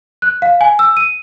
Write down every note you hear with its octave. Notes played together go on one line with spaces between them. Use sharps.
F#6
F5
G#5
E6
D#7